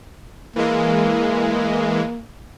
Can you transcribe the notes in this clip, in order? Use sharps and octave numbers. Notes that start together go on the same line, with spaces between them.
E3 G#3 A#3